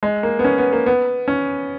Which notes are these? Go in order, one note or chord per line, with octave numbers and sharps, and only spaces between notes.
G#3
A#3
B3
C#4
B3
A#3
B3
C#4